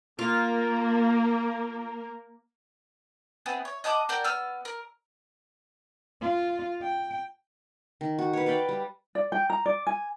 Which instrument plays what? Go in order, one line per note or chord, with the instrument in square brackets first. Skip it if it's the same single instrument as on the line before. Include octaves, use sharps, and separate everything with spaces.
[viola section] A#3 A#4 [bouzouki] F4
[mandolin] B3 C4 E4 G#4
C#5
D#5 F#5 A5 D6
F#4 A#4 D5 G5
B3 E6 F6
A#4
[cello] F4
G5
[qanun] D#3
F#4
B4 C#5
B4 D5 F5 G5
G3
[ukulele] D5
G5
A#5
D5
G#5